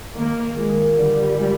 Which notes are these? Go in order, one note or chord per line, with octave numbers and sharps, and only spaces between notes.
D#3 A#3
G#3 A#3 F4
D3 G3
G#3 C4 F4